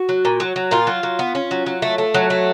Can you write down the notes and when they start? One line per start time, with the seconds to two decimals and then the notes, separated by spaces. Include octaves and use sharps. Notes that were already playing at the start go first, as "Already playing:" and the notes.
Already playing: F#4
0.09 F#3
0.25 A#2
0.40 F#3
0.56 F#3
0.71 A#2 F4
0.87 F#3
1.03 F#3
1.19 B3
1.35 C#4
1.51 F#3
1.66 F#3
1.82 A3
1.98 A3
2.14 F#3
2.30 A3